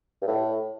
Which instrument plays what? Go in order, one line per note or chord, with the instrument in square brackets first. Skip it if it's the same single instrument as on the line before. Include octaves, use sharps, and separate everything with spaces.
[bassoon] G2
A2